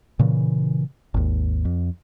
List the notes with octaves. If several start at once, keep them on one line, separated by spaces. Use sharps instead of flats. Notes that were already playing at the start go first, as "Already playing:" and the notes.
A#2 C#3 E3
G#1 D#2
F2